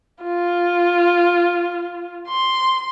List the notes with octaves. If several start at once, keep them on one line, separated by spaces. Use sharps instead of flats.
F4
C6